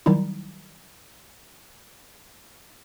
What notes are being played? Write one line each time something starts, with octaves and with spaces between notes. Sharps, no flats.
D#3 F#3 G3 D#4 E4